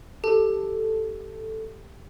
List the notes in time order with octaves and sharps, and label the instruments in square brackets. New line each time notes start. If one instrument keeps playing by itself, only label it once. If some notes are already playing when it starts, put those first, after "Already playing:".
[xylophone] G4 [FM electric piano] A4